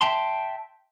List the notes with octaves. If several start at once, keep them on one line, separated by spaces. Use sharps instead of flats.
E5 G5 A5 C6